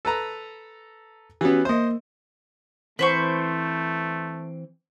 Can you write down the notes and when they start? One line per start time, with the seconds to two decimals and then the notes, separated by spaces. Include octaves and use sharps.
0.05 A4 B4 A#5
1.41 E3 B3 C#4 F#4 G4
1.65 A#3 C5 D#5 E5
2.99 E3 A3 C4 B4 C5 C#6